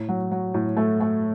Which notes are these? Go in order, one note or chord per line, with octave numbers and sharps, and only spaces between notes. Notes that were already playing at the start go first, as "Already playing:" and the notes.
Already playing: A2
F#3
F#3
A2
A3
A3